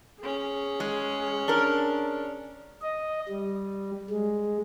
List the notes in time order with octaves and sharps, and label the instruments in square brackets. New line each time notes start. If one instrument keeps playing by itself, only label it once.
[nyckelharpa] C#4 G#4
[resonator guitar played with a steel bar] G#3
D4 A#4
[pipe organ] D#5
G3
G#3